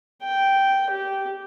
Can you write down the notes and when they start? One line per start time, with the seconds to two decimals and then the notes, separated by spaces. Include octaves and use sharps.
0.24 G5
0.91 G4